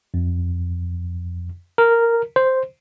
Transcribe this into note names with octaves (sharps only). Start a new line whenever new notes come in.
F2
A#4
C5